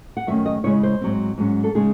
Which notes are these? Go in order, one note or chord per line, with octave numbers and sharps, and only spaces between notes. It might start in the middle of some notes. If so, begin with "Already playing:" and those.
F#5
F#2 D#3 A3 C#4 E5
D#5
C#3 G#3 C#4 E4 C#5
C5
G#2 F#3 C4
G#2 F#3 C#4
A4
C#3 G#3 D#4 G#4